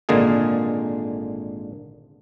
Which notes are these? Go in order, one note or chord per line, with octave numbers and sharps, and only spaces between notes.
G#1 A#2 D3 G#3 A#3 G#4